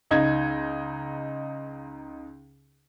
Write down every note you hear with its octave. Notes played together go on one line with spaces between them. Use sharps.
C#2 D#4 G#6